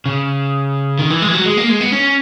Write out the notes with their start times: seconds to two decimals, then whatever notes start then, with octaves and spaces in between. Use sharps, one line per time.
0.06 C#3
0.99 D#3
1.10 E3
1.22 G#3
1.28 E3
1.34 F#3
1.46 G#3
1.57 A#3
1.69 G#3
1.81 B3
1.92 C#4